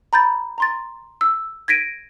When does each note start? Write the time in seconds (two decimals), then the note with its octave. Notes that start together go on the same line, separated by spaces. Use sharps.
0.13 A#5 B5 G6 A6
0.58 A#5 C6 A6
1.21 E6
1.68 G#6 A#6 B6 D7 D#7